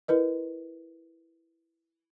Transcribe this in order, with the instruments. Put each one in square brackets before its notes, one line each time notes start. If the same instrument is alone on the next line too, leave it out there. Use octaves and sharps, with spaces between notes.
[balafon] E4 A#4 B4 D#5